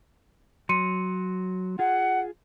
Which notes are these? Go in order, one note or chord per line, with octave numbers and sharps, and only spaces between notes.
F#3 C6 C#7 D#7
F4 G#4 F#5